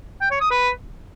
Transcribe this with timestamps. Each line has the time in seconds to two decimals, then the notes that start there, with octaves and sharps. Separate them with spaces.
0.21 G5
0.31 C#5
0.41 D#6
0.51 B4